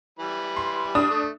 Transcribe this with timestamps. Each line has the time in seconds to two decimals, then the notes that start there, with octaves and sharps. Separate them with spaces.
0.19 E3 G3 B5
0.57 C6
0.95 D4 D#6
1.10 A3